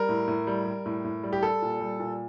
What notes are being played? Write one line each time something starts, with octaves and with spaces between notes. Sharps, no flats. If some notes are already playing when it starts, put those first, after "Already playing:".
Already playing: G3 A#4
A2
A2
G3
G3
A2
A2
G3
G4
G3 A4
A#2
G3
A#2